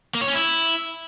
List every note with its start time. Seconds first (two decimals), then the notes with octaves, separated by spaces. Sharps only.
0.15 A#3
0.21 C#5
0.28 C#4
0.34 E4